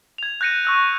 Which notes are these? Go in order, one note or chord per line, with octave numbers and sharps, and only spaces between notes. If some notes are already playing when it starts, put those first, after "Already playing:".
G#6 F7
F#6 G6 A#6 C#7 D#7
C#6 E6 F#6